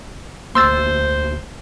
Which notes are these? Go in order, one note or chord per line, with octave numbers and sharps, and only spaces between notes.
D2 A3 A#3 C5 C6 E6 A6